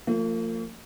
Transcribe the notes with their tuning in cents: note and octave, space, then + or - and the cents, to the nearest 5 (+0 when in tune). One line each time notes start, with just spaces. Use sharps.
F3 +0 A#3 -45